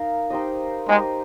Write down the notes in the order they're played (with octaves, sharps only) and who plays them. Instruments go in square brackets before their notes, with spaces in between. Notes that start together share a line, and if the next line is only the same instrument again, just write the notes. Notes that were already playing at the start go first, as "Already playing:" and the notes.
Already playing: [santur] D#4 A#4 F5
D#4 G4 C5 D#5
[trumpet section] G#3 [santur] D#4 G4 C5 D#5